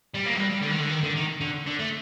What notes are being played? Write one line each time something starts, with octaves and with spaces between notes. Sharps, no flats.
G3
A#3
F#3
G3
G3
D3
D#3
D3
D#3
D3
D#3
D3
D3
A3